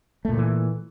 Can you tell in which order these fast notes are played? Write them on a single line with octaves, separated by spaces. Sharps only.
A3 A#2 D#3 E3